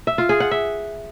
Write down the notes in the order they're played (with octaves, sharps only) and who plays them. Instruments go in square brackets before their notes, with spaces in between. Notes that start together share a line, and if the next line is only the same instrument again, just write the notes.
[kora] E5
F4
G#4
F#5
E5